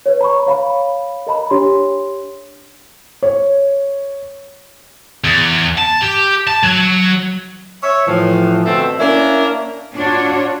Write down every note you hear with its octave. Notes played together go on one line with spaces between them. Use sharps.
B4 C#5
A#5 B5 C#6
C#5 F5 B5
A#4 D#5 A#5 B5
D4 G4 C#5 C6
C#5
E2
A5
G4
A5
F#3
C#5 E5
A2 E3 F3
B2 D3 A3 C4 A4 E5
A#3 C#4 D4 E4 A#4
D4 F4 F#4 C#5